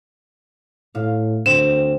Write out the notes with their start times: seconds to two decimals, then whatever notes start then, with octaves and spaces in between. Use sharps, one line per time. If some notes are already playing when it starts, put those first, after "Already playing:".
0.95 A2 F5
1.46 D2 C4 E7